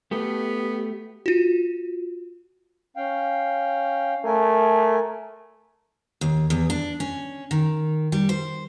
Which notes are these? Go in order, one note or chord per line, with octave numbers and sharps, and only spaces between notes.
A3 B3 G4
F4 F#4
C#4 F5 G5
A3 A#4 G#5
D#2
E2
D4
C#4
D#3
G3
C5